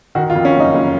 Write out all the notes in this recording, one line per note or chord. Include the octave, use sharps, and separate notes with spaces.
D#3 F#4
F4
F2
C#4
F#1 D#4
F#1